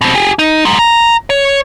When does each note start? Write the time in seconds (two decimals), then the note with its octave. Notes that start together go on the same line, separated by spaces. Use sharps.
0.01 B2 C4
0.15 G4 G#4
0.39 D#4
0.65 F#3 G#3
0.79 A#5
1.30 C#5